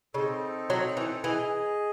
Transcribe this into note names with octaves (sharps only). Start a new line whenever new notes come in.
C#3 C4 D#4 A4
F#3
E3
E3 G#4 D#5